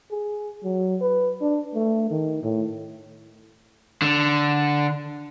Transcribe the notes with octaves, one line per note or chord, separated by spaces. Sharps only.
G#4
F#3
B4
D4
A3
D#3
A2
D3